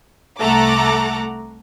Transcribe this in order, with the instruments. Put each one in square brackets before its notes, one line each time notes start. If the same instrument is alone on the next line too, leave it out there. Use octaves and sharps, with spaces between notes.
[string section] C2 A3 A4 F#5 A#5 D6